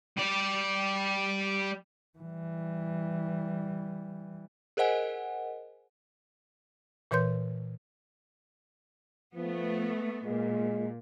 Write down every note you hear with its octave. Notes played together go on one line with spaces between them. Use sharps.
G3 D5
E3 G3
G#4 A#4 C5 D#5 F#5 G#5
A#2 E3 B4 C#5 C6 G6
F3 A3 B3
A#2 G#3